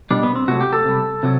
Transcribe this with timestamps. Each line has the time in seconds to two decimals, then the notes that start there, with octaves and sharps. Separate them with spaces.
0.10 B2 G3 D4
0.23 B3
0.35 C4
0.48 C3 F#3 A3 F#4
0.61 G4
0.73 A4
0.85 C3 G3
1.23 C3 F#3